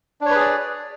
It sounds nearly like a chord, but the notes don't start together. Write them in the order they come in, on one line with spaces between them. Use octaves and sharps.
D4 C#5 B4 G#4 D5